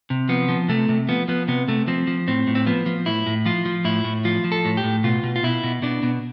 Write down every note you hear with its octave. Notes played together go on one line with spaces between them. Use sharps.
C3
F3 B3
F3
C3 A3
C3
F3 B3
F3 B3
C3 B3
C3 A3
F3 C4
F3
A2 C4
A2
C4
F3 B3
F3
A2 E4
A2
F3 F4
F3
A2 E4
A2
F3 F4
F3
A4
A2
G4
A2
B2 F4
B2
F4
B2 E4
B2
B2 D4
B2